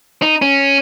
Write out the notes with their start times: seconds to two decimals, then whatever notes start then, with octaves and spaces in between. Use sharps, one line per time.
0.22 D#4
0.42 C#4